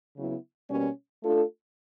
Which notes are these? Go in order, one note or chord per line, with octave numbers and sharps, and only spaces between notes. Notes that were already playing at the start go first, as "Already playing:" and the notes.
C#3 F#3 B3 E4
B2 G3 A#3 C#4
A3 D4 F4 A4